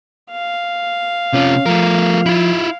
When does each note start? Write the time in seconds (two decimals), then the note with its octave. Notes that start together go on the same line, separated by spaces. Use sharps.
0.31 F5
1.33 C3 C#4 F4
1.66 F3 A3 A#4
2.26 E4 F4